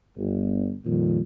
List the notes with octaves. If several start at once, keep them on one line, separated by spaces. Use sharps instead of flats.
G1
F2 A#2 D#3 G3